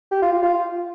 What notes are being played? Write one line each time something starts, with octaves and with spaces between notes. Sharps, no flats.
G4
F4
F4
F4